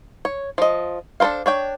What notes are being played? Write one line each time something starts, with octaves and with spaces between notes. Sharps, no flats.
C#5
F3 D#5
D4 A4 A#4 C5 F5
D4 C#5 G5